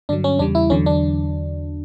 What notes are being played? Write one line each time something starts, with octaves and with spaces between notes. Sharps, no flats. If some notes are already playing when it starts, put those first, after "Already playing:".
G2 D3 F#3 D4
C#4
E2 C#3 G3 D4
E4
E2 D3 F#3 C#4
D4